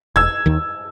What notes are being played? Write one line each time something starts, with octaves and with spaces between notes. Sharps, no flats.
E1 E6 G#6
D#2 D#3